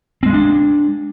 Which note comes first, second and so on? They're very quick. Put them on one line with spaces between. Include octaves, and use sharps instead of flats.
C4 G#3 B3 D4